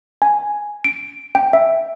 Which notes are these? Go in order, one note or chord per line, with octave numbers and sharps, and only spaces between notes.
G#5
D7
G5
E5